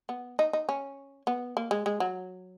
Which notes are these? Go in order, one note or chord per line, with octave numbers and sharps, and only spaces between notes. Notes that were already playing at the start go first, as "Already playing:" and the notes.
B3
D#4
D#4
C#4
B3
A#3
G#3
G#3
F#3